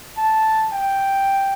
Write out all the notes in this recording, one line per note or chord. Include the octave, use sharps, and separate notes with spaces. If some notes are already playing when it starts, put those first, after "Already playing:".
A5
G5